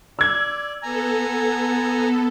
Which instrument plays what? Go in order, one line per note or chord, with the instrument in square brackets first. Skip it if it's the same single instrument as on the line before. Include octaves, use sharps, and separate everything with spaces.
[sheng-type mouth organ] D5 [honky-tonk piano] E6 G#6
[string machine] B3 A4 [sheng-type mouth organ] G#5 A#5